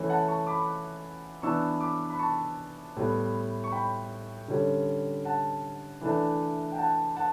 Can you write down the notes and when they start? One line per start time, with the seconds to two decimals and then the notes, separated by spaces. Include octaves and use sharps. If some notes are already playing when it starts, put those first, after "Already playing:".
Already playing: E3 A3 C#4
0.09 F#5 A5
0.28 A5 C#6
0.47 B5 D6
1.42 E3 B3 D4 C#6 E6
1.81 B5 D6
2.10 B5
2.19 A5 C#6
2.96 A2 G3 B3
3.64 C#6
3.72 G5 B5
4.48 D3 G3 C#4
5.25 F#5 A5
6.01 E3 A3 D4
6.72 G5
6.78 F#5 A5
7.16 F#5 A5